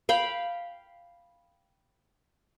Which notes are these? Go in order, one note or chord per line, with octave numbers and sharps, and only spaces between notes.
F5 G5 B5